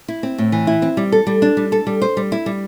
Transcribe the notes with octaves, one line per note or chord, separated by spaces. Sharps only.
E4
C4
A2
E3
E4
C4
G3
A4
G3
D4
G3
A4
G3
C5
G3
E4
G3